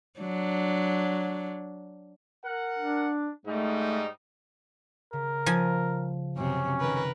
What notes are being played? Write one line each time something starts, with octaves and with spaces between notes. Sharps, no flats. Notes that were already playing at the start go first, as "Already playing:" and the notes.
F#3 D4
A#4 F#5
D4
G#2 G3 A3 D#4
C#3 A#4
F3 G#5
F#2 C3 F#3 C#4
D#3 A#4 B4